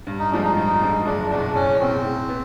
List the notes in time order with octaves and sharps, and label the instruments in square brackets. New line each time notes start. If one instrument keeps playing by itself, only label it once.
[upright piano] G2
[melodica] D#4
[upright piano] D3 F3 G#3 [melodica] D4
[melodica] D#4
[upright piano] G2 [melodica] D#4
[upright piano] D3 F3 G#3
[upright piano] F#1 [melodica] D4
[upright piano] E2 B2 [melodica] D4
[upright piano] F#1 [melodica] C#4
[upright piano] E2 B2 [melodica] C4
[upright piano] A2
B3